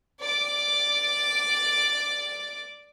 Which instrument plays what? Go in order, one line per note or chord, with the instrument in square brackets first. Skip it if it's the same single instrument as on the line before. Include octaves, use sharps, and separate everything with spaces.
[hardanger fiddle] D5 D6